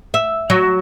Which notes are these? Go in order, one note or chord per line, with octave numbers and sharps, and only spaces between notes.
E5
F#3